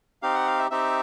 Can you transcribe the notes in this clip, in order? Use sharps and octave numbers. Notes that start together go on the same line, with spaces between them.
C4 D#4 G4 F5
F#5
F5
E5
C4 D#4 G4 E5